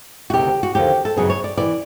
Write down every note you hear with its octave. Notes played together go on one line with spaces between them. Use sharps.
F#4
D2 C3 D#3 G4
F#4
D#2 D3 F3 A#3 G4
A4
F#2 C#3 F#3 B3 D#4 G#4
C#5
D5
C3 E3 D5